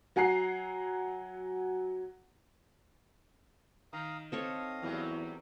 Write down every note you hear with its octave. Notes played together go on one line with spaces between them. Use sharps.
F#3 F#5 G#5 A#5 C7
D#3 F5 A#5 D#6
C4 A4 C#5 D#5 F5 D#6
E2 A2 F#3 G3